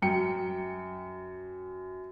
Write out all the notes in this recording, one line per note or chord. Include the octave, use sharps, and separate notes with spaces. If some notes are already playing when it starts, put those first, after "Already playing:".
F#2 G5 C#7